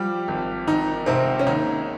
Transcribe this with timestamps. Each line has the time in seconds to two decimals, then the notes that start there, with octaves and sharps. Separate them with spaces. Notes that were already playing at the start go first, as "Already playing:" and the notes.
Already playing: F3 G3 G4
0.28 G#1
0.67 G#1 D#3 D#4
1.06 G#2 C3 C4
1.39 C#4
1.47 D#2 D#3 D#4